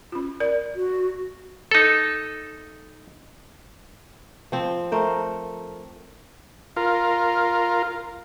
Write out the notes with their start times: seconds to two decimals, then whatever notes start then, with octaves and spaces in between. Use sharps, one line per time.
0.12 C#4 F4
0.40 A#4 D5
0.75 F#4
1.71 D#4 A4
4.52 F3 C4
4.92 A3 A#4 C5
6.76 F4 A#4